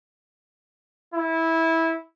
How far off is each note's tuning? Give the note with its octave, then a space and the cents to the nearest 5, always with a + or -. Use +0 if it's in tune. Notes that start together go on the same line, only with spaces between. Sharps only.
E4 -15